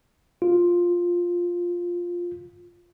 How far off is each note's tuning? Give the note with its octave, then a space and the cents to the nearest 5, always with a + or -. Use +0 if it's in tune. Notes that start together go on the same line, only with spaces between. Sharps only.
F4 +5